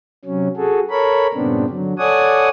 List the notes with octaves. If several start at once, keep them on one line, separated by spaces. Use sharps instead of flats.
C3 F#3 C#4
F#4 G#4 A4
A4 A#4 C#5 B5
G2 A#2 C#3 B3 C4 D4
D3 F#3
A4 C#5 D5 F#5 G#5 D#6